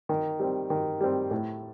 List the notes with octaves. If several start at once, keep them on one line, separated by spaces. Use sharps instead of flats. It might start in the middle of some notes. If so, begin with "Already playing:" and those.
D#3
G3 C4
D#3
G3 C4
A2